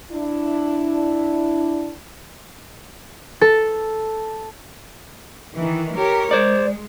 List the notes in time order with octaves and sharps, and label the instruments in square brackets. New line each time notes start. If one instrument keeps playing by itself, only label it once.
[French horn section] D4 E4
[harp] A4
[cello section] D#3 E3
G4 A#4 C#5
[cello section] G#3 [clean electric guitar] C5 D5